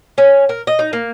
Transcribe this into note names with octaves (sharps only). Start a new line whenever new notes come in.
C#4
A#4
D#5
D#4
A#3